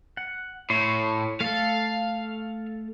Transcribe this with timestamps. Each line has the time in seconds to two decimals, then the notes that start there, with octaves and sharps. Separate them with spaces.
0.17 F#5
0.70 A2 C#5 C6
1.40 A3 A4 F5